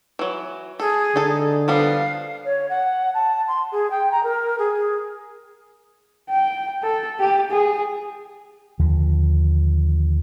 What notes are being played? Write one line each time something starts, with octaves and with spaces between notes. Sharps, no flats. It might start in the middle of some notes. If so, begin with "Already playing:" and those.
E3 F#3
G#4 A4
D3 D#4 A4
F3 G3 B3 F5
C#5
F#5
A5
C6
G#4
G5
A#5
A#4
G#4
G5
A4
G4
G#4
D#2 D3 F3